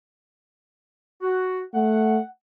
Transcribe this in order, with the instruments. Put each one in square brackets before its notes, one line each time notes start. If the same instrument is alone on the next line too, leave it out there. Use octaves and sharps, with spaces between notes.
[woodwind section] F#4
[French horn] A3 [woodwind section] F#5